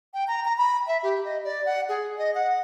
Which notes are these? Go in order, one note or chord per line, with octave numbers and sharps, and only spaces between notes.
G5
A#5
A#5
B5
E5
G4
D#5
D5
F#5
G#4
D#5
F#5